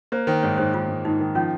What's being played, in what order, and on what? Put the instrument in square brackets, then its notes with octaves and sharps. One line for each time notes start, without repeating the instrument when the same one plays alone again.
[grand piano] A#3 [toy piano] C5
[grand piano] D#3 [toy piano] C5
[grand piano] G#2 [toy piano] C#5
[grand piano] G#2 [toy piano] C5
[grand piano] D#3 [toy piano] F4
[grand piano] G#2
[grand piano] G#2 [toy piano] D#4
[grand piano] D#3
[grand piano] F3 [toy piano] C#4